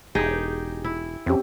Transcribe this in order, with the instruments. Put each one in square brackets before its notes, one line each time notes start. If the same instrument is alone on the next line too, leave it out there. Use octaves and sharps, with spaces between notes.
[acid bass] E1 [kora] D#4 G4 G#4
[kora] E4
[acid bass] F2 [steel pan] C4 C#4 G4